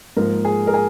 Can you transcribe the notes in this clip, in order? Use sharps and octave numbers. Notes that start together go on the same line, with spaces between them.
G#2 F3 A#3 A#4
G#4
A#4
G#4